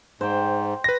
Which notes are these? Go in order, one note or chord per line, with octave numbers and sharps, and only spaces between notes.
G#2 C5 G5
B4 A#6